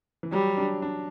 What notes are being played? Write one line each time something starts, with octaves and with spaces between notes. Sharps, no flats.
E3
F#3 G3
D4
D4